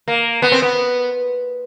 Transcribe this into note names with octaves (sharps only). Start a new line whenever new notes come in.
A#3
B3
C4
B3